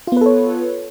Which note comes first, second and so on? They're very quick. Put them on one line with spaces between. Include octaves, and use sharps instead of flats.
F4 B3 B4 A4 C#5